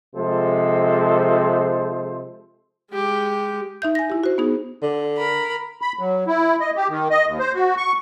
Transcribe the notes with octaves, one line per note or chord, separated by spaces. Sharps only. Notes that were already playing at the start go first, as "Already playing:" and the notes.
C3 F3 G#3 A4 C5
G#3 G4
D#4 E5 G6
G#5 A#6
E4 G4
F#4 C5
B3 D#4 G#4
D3
A#4 B5
B5
F#3
E4
D#5
G4
D#3
D#5
D#2
C5
F#4
C#6